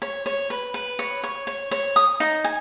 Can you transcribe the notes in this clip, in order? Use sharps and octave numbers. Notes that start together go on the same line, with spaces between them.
C#5
C#5
B4
B4
C#5
C#5
C#5
C#5
D#6
D#4
G#5